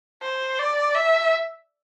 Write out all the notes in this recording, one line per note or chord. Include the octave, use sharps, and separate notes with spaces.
C5
D5
E5